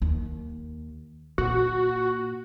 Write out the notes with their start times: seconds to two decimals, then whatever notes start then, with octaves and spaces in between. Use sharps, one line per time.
0.02 D#2
1.38 A#2 F#4